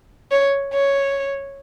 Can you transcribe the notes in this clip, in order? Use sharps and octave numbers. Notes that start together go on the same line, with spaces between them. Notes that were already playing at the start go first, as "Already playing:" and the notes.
C#5
C#5